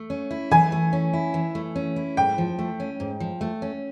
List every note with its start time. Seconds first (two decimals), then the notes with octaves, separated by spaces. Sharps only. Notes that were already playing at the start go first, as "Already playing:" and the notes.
Already playing: A3
0.10 C#4
0.31 E4
0.51 E3 G#5
0.72 A3
0.93 C#4
1.13 E4
1.34 E3
1.55 A3
1.76 C#4
1.96 E4
2.17 G#2 G5
2.38 F3
2.59 A3
2.80 C#4
3.00 G#2
3.20 F3
3.41 A3
3.62 C#4